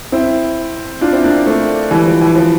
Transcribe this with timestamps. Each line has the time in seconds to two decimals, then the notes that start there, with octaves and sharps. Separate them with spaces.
0.12 C4 E4
1.01 D4 F4
1.13 C4 E4
1.24 A#3 D4
1.46 A3 C4
1.91 E3 G3
2.06 F3
2.21 E3
2.35 F3